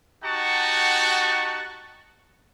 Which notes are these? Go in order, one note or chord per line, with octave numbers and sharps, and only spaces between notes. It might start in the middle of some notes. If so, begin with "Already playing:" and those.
D#4 F#4 G4 F#5 A5 C#6